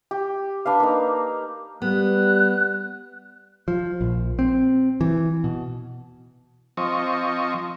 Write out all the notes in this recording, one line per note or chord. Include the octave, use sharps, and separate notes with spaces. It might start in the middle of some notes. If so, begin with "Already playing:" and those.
G4
D4 B4 F5
A#3 D#4
G3 B3 F#6
F3
A#1
C4
E3
B2
F3 C4 D#5 C#6